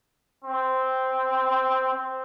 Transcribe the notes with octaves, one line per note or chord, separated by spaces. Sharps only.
C4
C4